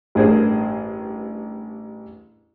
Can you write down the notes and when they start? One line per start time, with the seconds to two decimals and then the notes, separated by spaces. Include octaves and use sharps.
0.15 A1 G2 D4 G#4 A#4 C5